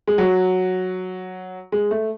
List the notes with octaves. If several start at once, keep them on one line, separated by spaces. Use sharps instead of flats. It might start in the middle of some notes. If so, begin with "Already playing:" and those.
G#3
F#3
G#3
A3